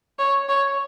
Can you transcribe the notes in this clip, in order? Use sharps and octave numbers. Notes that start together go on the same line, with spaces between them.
C#5
C#5